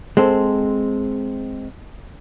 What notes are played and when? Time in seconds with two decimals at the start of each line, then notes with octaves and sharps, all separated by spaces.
0.17 G#3 C4 A4